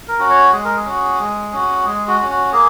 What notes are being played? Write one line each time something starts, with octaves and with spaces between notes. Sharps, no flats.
A#4
C#4 F#4
C#5
G#3 G#4
A#4
G#4
C#4 F#4
G#3
C#4 F#4
G#3 G#4
F#4
F#4
C#4
F#4
A#3 G#4